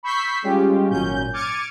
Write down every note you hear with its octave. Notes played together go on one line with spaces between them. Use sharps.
B5 C#6 E6 G6 B6 C7
G3 G#3 C#4 F4 G4
G#1 A#2 F#3 C#4 G6
D6 F6 G#6 A6 C#7 D#7